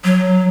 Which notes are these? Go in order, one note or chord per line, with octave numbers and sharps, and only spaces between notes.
F#3